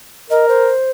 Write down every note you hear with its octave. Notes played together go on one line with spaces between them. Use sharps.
A#4 D#5
C5